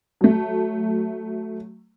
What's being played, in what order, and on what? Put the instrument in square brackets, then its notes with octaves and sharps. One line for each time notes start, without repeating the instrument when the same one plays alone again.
[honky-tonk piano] F#3 A3